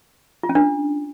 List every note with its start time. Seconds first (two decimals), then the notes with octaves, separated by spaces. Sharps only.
0.43 F4
0.49 C#4
0.55 D4